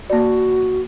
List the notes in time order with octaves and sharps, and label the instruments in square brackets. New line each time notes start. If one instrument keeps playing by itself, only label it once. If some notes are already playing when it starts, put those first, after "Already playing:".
[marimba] A#3 D5 [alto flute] F#4